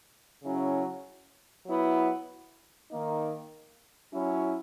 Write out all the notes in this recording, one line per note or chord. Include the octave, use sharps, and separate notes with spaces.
C#3 F#3 C#4 E4
F#3 B3 E4
D#3 A#3 D#4
F#3 C#4 E4